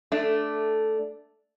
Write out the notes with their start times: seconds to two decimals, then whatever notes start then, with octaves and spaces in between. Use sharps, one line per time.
0.12 A3 D4